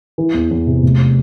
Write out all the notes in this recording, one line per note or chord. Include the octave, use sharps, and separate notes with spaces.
E3
E2
E2
C3
F1